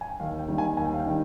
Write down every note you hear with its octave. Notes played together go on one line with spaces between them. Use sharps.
G#5
G5
D#2 F5
G5
D#3 G3 A#3
G#5
D#2 G#5
G5
F5
G5
D#3 G3